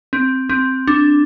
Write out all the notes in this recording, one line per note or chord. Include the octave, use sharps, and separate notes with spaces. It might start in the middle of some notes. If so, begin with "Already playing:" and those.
C4
C4
D4